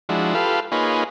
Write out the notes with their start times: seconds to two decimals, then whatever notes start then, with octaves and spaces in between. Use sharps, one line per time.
0.09 F3 G#3 D4 E4 F#4
0.34 F4 G4 A4 B4 F5
0.72 A#3 D#4 F4 G#4 B4 C#5